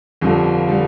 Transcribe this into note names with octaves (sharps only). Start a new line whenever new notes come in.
G1 F2 D3 G3
D3 G3